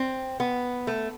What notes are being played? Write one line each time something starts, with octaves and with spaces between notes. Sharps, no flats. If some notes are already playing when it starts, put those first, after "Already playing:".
Already playing: C4
B3
A3